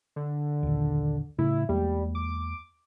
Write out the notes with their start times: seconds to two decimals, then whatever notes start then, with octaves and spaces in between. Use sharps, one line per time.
0.16 D3
0.63 A#1 D#2
1.39 A2 C#3 A3 E4
1.69 E2 G3 G#3 A#3
2.15 D6